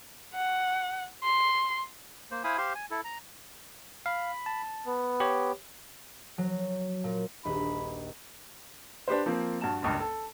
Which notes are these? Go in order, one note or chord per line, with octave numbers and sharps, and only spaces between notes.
F#5
C6
A#3 C5
E4 C5 F5 G#5 B5 D#6
G4 C5 F5 C6
G#5
E4 A4
A#5
F5 B5
A5
B3
G4 C#5
F#3
A#2
D#1 A#1 D#5 B5
D4 G4 B4 C5
F3 A#3 C4
G2 F#4 A5 E7
F#1 C#2 G2
A4